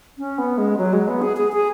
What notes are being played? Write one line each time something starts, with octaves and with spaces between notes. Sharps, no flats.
C#4
B3
G#3
F#3
G#3
B3
G#4
G#4
G#4